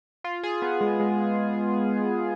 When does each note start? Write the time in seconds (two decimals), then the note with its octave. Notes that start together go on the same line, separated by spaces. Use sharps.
0.24 F4
0.43 G#4
0.62 B3
0.81 G#3
1.00 G#3